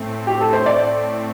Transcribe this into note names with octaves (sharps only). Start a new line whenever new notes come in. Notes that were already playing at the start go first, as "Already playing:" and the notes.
Already playing: A2 A3 C4
G4
A4
C5
D5